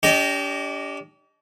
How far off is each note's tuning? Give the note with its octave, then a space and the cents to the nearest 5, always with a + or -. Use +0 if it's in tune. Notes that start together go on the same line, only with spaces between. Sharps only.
D4 -45 G4 +0 D#5 +0